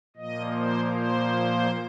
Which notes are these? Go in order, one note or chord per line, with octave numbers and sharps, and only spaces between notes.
A#2 F3 A#3 D#5
C5
C5